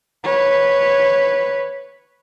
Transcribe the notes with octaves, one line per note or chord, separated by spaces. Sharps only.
B4 C#5